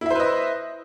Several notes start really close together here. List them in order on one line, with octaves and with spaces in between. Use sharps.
E4 E5 C5 B4 D#5